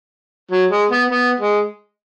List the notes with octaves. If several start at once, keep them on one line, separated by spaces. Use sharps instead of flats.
F#3
G#3
B3
B3
G#3